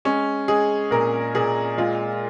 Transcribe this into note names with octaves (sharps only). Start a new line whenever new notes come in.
G#3 C#4
G#3 G#4
A#2 A#4
A#2 G#4
G#3 F4